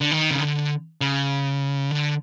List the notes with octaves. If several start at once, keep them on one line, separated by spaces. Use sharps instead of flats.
D3
D#3
C#3
D3
C#3
D3